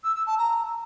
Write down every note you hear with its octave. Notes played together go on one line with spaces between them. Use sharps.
E6
E6
A5
A#5